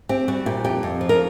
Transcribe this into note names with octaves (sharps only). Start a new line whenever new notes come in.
C4 G4
G3 F#4
A#2 G4
F2 G4
F2
F3
A#4